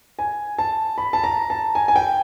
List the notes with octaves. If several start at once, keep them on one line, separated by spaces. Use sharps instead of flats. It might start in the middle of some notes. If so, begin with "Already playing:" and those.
G#5
A5
B5
A5
A#5
A5
G#5
G#5
G5